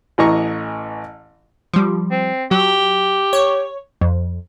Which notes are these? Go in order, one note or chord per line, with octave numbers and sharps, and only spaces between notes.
A1 E3 D#5 A#5 C#6
F3 G3
C4
F#3 G4
C#5
F2